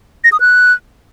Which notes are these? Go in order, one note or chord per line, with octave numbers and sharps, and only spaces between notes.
A#6
D#6
F#6